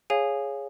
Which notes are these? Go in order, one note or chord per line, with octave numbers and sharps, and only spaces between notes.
G#4 C#5 F5 G#5